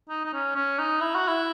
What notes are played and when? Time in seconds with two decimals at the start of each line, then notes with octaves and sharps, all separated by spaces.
0.09 D#4
0.25 D#4
0.33 C#4
0.55 C#4
0.79 D#4
1.01 E4
1.15 F#4
1.28 E4